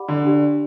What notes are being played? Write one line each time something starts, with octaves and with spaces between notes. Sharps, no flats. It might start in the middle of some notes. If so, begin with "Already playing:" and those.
Already playing: G4 D5 F#5 B5 D6
D3
D4 G4 D5